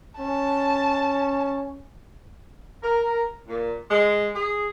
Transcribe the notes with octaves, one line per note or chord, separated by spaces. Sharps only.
C#4 A5
A#4
A#2
G#3
G#4